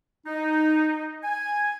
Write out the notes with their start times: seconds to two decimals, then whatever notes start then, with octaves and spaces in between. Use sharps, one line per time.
0.25 D#4
1.23 G#5